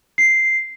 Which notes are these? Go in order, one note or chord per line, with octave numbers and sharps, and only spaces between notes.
C7